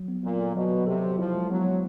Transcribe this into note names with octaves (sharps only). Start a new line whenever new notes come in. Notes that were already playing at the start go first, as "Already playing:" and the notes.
Already playing: F#3
B3
A#2 F#3
A4
B2 F#3
F#3
C3 A4
F#3
F3 E4
G#3
F#3 B3
G#3